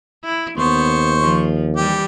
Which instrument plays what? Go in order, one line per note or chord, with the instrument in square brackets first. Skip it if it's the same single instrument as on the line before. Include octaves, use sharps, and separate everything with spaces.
[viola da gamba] E4
[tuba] D#2 [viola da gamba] B3 [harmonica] C5 C#6
[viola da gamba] F3
[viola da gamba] E3 G3 [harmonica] G4